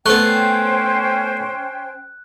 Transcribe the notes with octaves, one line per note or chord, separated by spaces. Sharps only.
A3 B3 C#4 C5 G5 F#6